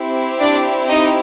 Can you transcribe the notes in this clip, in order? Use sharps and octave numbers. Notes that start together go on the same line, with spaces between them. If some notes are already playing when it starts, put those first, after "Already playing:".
Already playing: C4 E4 G4
D4 D5
D#4 D#5